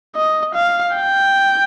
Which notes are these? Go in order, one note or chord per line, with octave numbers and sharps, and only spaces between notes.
D#5
F5
G5